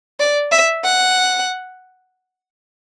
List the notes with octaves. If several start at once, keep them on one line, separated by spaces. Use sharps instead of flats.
D5
E5
F#5